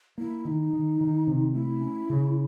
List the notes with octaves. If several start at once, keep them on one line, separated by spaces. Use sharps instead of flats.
A#3 E4
D#3 D#4
D#3
D#3
C3
A3 E4
C#4
C#3